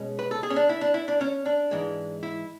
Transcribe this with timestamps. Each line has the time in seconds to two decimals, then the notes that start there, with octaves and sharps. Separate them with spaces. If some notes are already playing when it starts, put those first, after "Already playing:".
Already playing: B2 G#3 C#4
0.19 B4
0.31 A4
0.43 G#4
0.50 C#4
0.56 D4
0.69 E4
0.81 D4
0.94 E4
1.08 D4
1.21 C#4
1.46 D4
1.71 G#2 E3 G#3
2.23 E4